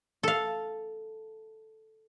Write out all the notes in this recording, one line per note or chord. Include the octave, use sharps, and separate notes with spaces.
A4 F5